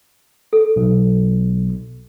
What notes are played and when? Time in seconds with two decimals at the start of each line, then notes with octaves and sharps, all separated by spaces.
0.53 A4
0.76 B1